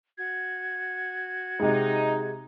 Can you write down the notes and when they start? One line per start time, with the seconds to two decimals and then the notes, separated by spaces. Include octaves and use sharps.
0.17 F#4 G#6
1.60 C3 G#3 D#4